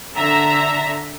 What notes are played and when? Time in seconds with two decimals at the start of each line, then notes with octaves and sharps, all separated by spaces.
0.15 D3 E5 A#5